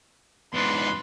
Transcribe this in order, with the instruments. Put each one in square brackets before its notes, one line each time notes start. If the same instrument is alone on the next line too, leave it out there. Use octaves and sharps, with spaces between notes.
[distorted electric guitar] E2 G#2 [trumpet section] D4 B4 [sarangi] C6